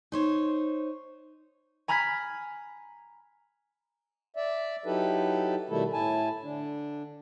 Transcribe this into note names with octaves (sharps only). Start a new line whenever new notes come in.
D#4 C5 C#5
G#5 A#5 B5 F6 G#6 B6
D5 E5
F#3 D#4 E4 G4 A4 B4
B2 D#3 G3 A3 E4 A4
A2 E4 G#5 A5
D3 D4